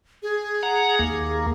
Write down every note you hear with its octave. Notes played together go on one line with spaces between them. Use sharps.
G#4
F#5 A#5
D#2 A#3